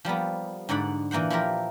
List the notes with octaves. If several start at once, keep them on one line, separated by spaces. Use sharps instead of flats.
F3 G3 A#3 B3
G#2 D3 D5 F#5 B5
A#2 E3 A#3 C5 F#5
F3 E4 F4 G4 A#4